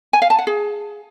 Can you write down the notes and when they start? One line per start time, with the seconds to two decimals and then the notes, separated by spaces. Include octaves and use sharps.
0.13 G#5
0.22 F5
0.30 A5
0.39 F#5
0.47 G#4